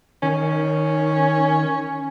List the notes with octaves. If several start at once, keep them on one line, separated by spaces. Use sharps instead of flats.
D#3 C#4